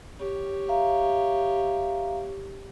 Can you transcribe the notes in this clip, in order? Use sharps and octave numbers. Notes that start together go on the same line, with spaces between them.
G4 C#5
E5 F5 A#5